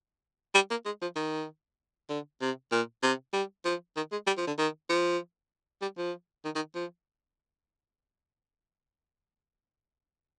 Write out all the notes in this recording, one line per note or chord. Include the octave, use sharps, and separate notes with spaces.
G3
A#3
G#3
F3
D#3
D3
C3
A#2
C3
G3
F3
D#3
G#3
G3
F3
D3
D#3
F3
G3
F3
D#3
D#3
F3